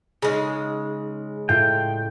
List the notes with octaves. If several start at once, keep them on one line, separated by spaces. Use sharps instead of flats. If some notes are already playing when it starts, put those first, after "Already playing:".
C#3 G#3 D#4 G#4
A2 F4 G5 G6